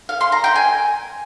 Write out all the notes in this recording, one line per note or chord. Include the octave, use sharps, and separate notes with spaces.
F5
C6
A#5
G5
G#5